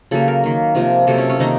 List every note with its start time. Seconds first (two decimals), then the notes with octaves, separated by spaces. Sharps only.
0.11 C#3 F#3 A#3 A4
0.28 A#4
0.44 D#3 A#3
0.75 C3 F3 A#3
1.07 C3 F#3 A#3 A4
1.18 C#4
1.30 C#4
1.39 C3 D#3 A#3 D#4